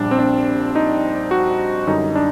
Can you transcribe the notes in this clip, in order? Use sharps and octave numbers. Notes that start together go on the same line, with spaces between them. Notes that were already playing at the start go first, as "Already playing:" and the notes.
Already playing: A#1 A#2 G3 D4
C4
D4
D#4
F#4
F#2 D3 G3 D#4
D4